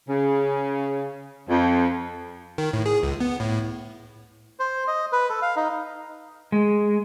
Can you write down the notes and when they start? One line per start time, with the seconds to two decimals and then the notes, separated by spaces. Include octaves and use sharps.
0.09 C#3
1.49 F2
2.58 D#3
2.73 A2
2.86 G#4
3.03 C#2
3.20 B3
3.40 A2
4.59 C5
4.88 D#5
5.13 B4
5.29 A4
5.42 F5
5.56 D#4
6.52 G#3